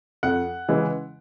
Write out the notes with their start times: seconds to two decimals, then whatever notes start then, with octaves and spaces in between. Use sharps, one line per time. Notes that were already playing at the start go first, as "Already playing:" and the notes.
0.23 F2 F#5
0.69 C#3 E3 G#3